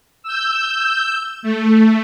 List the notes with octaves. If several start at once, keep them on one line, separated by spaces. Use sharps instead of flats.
E6 G6
A3